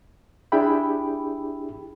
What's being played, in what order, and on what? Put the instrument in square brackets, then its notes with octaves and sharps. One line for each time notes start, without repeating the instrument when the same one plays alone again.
[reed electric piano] D4 E4 G4 G#4 G5 B5